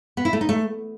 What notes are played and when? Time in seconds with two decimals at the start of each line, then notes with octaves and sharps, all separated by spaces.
0.17 B3
0.25 E4
0.33 A3
0.41 D#4
0.49 A3